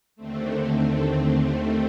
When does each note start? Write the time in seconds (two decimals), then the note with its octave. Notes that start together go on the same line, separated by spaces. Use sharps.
0.16 D#2 D3 A3 C4
0.83 C4
1.49 D#2 D#3 A3 C4